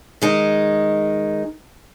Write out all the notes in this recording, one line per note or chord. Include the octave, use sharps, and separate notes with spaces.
D#3 G#3 D#4